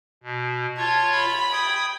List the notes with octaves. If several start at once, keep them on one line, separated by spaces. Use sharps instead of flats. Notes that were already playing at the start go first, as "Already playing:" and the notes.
B2
F4 C#5 A5 G#6
B5
G5 D#6 G#6